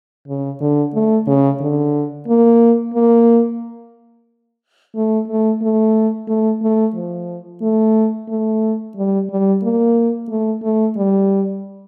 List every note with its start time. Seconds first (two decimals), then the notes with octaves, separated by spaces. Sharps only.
0.28 C#3
0.61 D3
0.94 A3
1.27 C#3
1.61 D3
2.28 A#3
2.95 A#3
4.96 A3
5.28 A3
5.62 A3
6.28 A3
6.62 A3
6.95 F3
7.62 A3
8.29 A3
8.97 G3
9.30 G3
9.63 A#3
10.29 A3
10.63 A3
10.97 G3